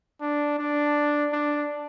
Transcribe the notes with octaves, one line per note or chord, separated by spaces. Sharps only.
D4
D4
D4